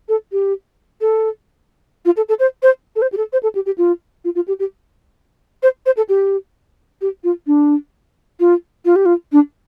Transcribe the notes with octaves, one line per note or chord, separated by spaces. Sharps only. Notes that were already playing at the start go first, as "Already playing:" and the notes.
A4
G4
A4
F4
A4
A4
C5
C5
A4
C5
G4
A4
C5
A4
G4
G4
F4
F4
F4
G4
G4
C5
C5
A4
G4
G4
F4
D4
F4
F4
G4
F4
D4